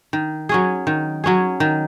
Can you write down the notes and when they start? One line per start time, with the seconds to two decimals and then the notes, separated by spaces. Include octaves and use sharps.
0.13 D#3
0.49 F#3 C#4 G#4
0.87 D#3
1.24 F#3 C#4 G#4
1.60 D#3